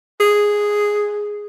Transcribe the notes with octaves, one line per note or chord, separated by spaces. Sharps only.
G#4